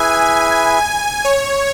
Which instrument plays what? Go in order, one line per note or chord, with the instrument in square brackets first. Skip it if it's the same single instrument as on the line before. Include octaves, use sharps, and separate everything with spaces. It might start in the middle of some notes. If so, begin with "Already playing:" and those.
Already playing: [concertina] E4 G#4 B4 E5 [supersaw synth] G#5
[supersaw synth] C#5